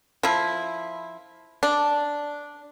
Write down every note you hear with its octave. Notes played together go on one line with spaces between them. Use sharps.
F3 E4
D4